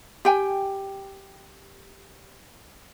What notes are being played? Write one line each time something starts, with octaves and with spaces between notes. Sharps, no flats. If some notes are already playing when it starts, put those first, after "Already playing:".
G4 G5 G#5